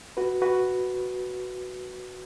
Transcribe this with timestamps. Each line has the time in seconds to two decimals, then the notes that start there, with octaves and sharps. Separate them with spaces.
0.17 F#4 B4
0.42 F#4 B4